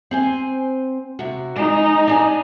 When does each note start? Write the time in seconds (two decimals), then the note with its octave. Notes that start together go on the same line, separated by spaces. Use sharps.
0.11 C4 C5 G#5
1.19 C3 F#4
1.56 C#3 G#3 D#4
2.07 D4 G5 G#5